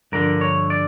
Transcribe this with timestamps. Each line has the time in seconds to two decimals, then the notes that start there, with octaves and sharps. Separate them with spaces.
0.12 G2 D3 F3 A#4
0.41 C#5
0.70 D5